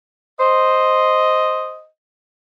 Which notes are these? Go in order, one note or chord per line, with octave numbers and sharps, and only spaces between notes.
C5 D#5